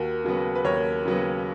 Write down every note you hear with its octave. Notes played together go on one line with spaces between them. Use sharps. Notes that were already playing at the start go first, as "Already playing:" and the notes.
Already playing: D#2 F#4 A#4
C#3 F#3 B3
B4
D#2 A#4 C#5
C#3 F#3 B3